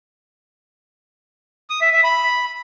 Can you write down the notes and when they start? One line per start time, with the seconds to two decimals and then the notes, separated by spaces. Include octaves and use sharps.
1.70 D#6
1.81 E5
1.93 E5
2.04 B5